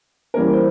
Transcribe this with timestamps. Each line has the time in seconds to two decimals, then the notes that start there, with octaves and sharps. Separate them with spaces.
0.34 E3 G3 A#3 C#4 A#4
0.53 C5